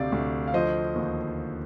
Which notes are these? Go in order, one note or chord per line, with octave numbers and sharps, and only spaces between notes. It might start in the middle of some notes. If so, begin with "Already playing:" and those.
Already playing: D2 C3 D5 F5
D2
F5
F3 C5 D#5
D#2